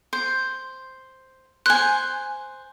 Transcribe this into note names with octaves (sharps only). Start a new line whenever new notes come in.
C5
C5 G#5 F#6